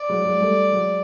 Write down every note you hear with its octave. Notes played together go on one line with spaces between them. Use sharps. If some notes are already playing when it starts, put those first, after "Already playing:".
Already playing: D5
F#3 G#3
F#3 G#3
G3 A3
F#3 G#3